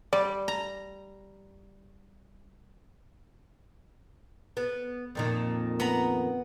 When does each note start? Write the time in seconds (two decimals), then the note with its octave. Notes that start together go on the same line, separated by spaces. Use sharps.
0.13 G3 D5
0.48 A#5
4.57 B3
5.15 F2 A#2 D#3
5.80 B3 A#5